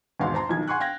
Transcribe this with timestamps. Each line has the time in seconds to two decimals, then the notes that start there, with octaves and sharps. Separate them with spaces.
0.20 G#1 E2 B2 F5 F#5 C6
0.34 C5 A5 A#5 C6
0.49 B1 D#3 F3 G#6
0.68 F#5 G#5 C6 C#6 F#6
0.80 F5 G5 G#6 A#6